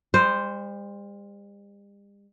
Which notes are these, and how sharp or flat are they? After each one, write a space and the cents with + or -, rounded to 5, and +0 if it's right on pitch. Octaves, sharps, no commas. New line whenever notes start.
G3 +45 C5 +0